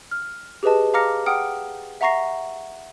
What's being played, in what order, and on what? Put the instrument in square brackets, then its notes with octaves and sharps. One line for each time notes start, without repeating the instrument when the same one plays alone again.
[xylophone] F6
G4 G#4 B4 D#5 A5
F5 A#5 D6 F6 A#6 C#7
F#5 G5 D#6 F6 C#7 D7
E5 F#5 A#5 C#6 A#6 C7